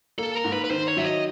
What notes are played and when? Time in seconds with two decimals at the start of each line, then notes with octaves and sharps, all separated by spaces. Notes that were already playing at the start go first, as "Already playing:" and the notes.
0.18 A#3 A4
0.35 A#4
0.44 G#2
0.53 B4
0.64 B4
0.70 D#3 C5
0.88 C#5
0.97 F#3 E5
1.06 D#5